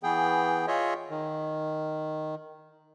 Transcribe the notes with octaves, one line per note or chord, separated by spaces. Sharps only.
E3 B3 G#4 G5
F4 G#4 C#5 D#5 E5
D#3